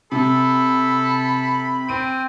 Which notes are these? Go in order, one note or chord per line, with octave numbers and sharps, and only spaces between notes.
C3 A4 B5
C4 D7 D#7